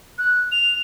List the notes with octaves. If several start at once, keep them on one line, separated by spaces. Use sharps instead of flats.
F#6
F7